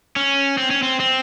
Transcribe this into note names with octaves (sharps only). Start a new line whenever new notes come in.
C#4
C4
C#4
C4
C4